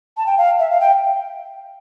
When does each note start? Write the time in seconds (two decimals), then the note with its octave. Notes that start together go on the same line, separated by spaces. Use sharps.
0.17 A5
0.26 G5
0.38 F5
0.59 E5
0.70 F5
0.80 G5